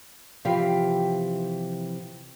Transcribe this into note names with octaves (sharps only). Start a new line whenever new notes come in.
C3 E3 F3 G4 F5 G5